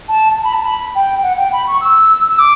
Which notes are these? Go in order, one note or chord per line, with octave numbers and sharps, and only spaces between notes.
A5
A5
B5
A5
B5
G5
F#5
G5
B5
C#6
E6
E6
D6